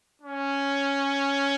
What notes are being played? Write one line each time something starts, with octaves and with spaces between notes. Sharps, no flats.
C#4